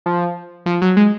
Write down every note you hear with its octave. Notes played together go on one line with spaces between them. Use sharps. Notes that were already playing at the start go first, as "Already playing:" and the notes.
F3
F3
F#3
G#3